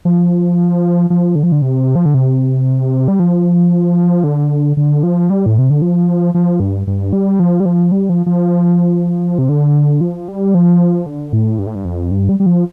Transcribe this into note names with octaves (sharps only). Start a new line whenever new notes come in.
F3
F3
D3
F3
D3
C3
F3
D3
C3
G3
F3
D3
D3
F3
G3
A2
C3
D3
F3
F3
G2
G2
G3
F3
G3
F3
G3
F3
F3
C3
D3
F3
G3
F3
D3
A2
G2
A2
G2
F2
G2
G3
G3
F3